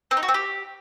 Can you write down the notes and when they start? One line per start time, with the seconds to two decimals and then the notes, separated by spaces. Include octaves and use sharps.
0.11 C4
0.17 D#4
0.23 F#4
0.28 C4
0.34 G4